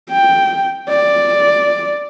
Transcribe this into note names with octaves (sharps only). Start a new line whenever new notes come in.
G5
D5